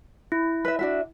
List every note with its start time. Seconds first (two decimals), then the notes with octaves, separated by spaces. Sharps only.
0.32 E4
0.65 B4 E5
0.79 D4 F#4 E5